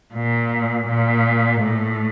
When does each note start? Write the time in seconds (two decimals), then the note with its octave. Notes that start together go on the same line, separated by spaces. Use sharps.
0.14 A#2
0.88 A#2
1.61 A2